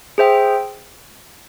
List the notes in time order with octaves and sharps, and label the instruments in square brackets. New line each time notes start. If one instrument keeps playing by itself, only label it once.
[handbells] G#4 C5 E5 G5